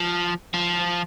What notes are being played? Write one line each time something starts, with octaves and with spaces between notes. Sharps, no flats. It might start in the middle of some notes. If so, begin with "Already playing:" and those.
Already playing: F3
F3